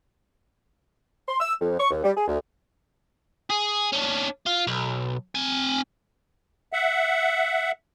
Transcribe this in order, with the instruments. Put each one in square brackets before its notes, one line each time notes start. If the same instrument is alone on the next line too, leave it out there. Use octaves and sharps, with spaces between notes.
[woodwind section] C6
E6
F2
C#6
D#2
G3
G#4
D2
[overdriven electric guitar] G#4
C#4 D4
F4
B1
C4 G#5
[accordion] E5 F#5